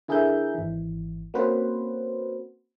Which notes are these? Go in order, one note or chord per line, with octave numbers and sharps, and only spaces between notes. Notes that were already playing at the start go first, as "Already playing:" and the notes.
D3 E4 G#4 A#4 E5 G6
G#1 E3
A#3 C4 C#4 F#4 B4 C5